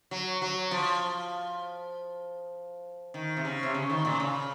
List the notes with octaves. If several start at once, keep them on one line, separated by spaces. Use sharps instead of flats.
F#3
F#3
F3
D#3
C3
C#3
C3
C#3
D#3
A#2
C#3